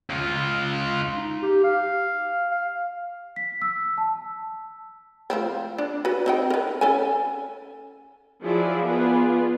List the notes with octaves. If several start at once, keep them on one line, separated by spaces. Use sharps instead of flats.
C#2 F4
D#4
G4
F5
F5
B6
E6
A5
F3 A3 C4
D4
F#4 B4
C4 D#4 G5
A#4 B4
C#4 A4 G#5
F3 F#3 E4 F4 G#4 D5
B3 F4 G#4 B4 D5